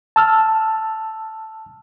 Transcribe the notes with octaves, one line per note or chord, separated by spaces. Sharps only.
A5 E6 F6